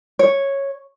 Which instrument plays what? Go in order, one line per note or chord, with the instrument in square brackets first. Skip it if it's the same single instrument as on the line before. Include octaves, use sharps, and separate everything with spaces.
[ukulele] C#5